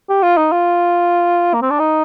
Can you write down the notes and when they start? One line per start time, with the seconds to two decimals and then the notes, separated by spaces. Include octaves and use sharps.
0.09 G4
0.23 F4
0.37 D#4
0.52 F4
1.54 A#3
1.62 C4
1.70 D4
1.79 D#4